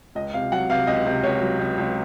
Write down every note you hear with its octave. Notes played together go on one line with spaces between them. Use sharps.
C#2 D#5
C3 F5
F#3 F#5
C3 F5
C#2 D#5
C3
C#2 C#5
F#3
C#2
C#2